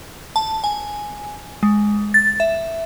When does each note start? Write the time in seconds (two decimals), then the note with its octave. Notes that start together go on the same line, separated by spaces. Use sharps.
0.36 A5
0.64 G#5
1.63 G#3
2.14 A6
2.40 E5